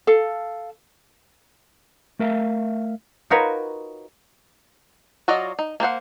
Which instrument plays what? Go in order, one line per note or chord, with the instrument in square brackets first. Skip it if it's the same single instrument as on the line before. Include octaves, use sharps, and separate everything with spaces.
[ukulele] A4 F5
[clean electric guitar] A3 A#4 E5 F5
[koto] D#4 F4 F#4 A#4 B4 C#5
[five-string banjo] F#3 F4 F#4 D5 D#5
D#4
A#3 D4 C5 F#5